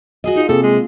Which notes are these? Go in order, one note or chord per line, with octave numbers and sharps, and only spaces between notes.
F#4 G#4 D#5
D#4 F4
C3 A#3 G#4 A4
G#3